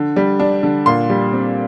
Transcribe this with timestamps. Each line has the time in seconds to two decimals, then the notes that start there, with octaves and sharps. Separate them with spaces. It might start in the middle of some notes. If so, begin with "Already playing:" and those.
Already playing: D3
0.16 G3
0.39 D4
0.63 D3
0.86 A#2 C6
1.10 G3
1.33 C4